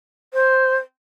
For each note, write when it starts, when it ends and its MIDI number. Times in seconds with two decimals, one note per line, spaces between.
0.34 0.76 72